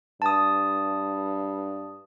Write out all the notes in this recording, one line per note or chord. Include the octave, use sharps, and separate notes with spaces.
G2 A5 D#6